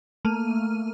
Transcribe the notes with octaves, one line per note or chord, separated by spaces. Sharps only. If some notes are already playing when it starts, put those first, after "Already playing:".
A3 A#3 F6 D#7